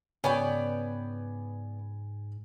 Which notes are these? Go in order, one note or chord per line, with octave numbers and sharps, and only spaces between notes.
G#2 C#3 B3 C#5 D5 G5 G#5 B5